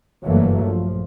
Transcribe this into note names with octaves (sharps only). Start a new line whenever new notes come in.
F#1 G2 E3 F#3 A3 A#3
A#1 F3